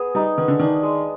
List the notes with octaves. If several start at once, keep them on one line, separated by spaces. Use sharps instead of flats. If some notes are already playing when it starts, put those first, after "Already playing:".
Already playing: B3 G#4
G3 D#4
D#3 B3
D3
D#3 D4
G#3